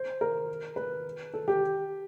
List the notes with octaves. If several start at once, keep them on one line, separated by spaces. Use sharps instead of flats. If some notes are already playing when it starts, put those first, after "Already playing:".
Already playing: C5
A#4
B4
A4
G4